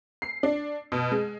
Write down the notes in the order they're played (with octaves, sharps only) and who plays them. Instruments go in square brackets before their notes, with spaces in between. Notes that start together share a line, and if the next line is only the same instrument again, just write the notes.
[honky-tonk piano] C7
D4
B2
G#3